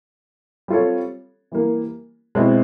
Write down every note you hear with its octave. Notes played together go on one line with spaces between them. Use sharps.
G3 C4 F4 A4 C#5
E3 G3 A#3
B2 G#3 C4 E4